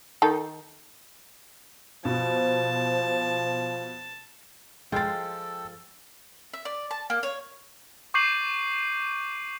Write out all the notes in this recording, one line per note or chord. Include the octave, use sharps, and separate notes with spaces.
D#3 D#4 A4
B2 F3 C5 A5
F3 G#3 F4 A4 G5 A6
E5
D5
A5
A#3
C#5
C#6 D6 G6 C7 D#7 F#7